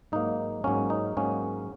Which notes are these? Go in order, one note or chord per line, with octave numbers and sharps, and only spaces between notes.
G#2 F#3 A#3 D#4
G#2 F#3 A#3 C#4
D#4
G#2 F#3 A#3 C#4